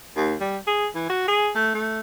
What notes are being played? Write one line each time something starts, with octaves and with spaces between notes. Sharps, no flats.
D#2
G3
G#4
E3
F#4
G#4
A3
A3